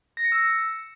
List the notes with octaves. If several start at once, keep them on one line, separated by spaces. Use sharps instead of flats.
A#6
C#7
E6